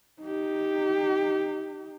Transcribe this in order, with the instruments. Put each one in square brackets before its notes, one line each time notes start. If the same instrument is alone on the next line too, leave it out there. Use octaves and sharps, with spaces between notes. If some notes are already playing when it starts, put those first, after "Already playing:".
[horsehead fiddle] D#4 G4